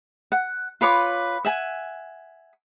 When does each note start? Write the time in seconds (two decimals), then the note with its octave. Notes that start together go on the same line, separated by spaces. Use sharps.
0.32 F#5
0.81 F4 B4 C#5 D6
1.45 E5 F#5 G#5